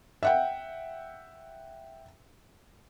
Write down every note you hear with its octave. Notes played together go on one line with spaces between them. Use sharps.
E5 F#5 G5